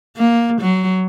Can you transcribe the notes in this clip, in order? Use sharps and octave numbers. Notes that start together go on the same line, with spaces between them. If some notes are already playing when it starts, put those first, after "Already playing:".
A#3
F#3